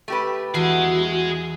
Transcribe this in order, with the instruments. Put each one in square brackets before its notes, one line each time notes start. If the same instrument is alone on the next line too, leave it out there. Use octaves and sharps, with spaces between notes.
[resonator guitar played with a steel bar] A3 G4 B4
[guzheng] E2 [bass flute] F#4 [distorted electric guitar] G#4 D#5